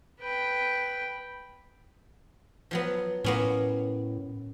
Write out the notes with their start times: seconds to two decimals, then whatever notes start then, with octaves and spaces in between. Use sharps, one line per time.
0.20 B4 G5
2.71 F3 F#3 B3
3.24 A2 A#3 B3 C#4